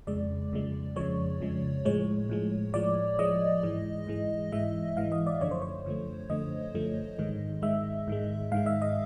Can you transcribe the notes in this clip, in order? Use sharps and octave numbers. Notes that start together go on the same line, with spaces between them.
F2 C#3 F3 G#3 D5
F2 C#3 F3 G#3
F2 C#3 F3 G#3 C#5
F2 C#3 F3 G#3
A2 F3 G#3 C#5
A2 F3 G#3
A2 F3 G#3 D5
A2 F3 G#3 D#5
G#2 E3 G#3
G#2 E3 G#3
G#2 E3 G#3 E5
G#2 E3 G#3 F5
D#5
D5
F#2 D3 F3 A3 C#5
C5
C#5
F#2 D3 F3 A3
F#2 D3 F3 A3 D#5
F#2 D3 F3 A3
G#2 D#3 G#3
G#2 D#3 G#3 E5
G#2 D#3 G#3
G#2 D#3 G#3 F5
E5
D#5